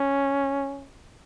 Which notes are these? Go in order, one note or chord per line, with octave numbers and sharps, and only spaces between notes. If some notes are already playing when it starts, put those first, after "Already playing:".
Already playing: C#4